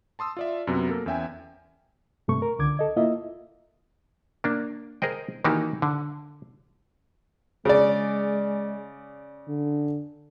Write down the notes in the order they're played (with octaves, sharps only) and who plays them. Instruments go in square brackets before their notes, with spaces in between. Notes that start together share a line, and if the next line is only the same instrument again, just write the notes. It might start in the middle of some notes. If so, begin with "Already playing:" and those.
[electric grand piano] A5 C6 D#6 E6
F4 D5 E5
F#2 C3 F#3 B3
A#3 A4 A#4
E2 C#4 E5 G5 G#5
[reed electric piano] G2 C3 A3 C#6
A#4
C#2 D3 D6 G#6
A4 D#5
A#3 E4 F4 D#5 E5
[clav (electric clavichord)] A#3 D4
G#4 A#4 C5 D#5 G5
D#3 E3 A#3 D#4 F#4 G4
D3
[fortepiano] C#3 D5 [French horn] G#3
[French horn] D3